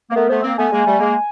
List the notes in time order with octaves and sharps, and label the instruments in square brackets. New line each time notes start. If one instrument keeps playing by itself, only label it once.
[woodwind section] A#3
[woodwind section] A3 B3 [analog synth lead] A#4
[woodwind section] A3 B3 [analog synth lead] C5
[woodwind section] A#3 C4
[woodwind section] A3 B3 [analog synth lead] G#5
[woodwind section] G#3 A#3
G3 A3
G#3 A#3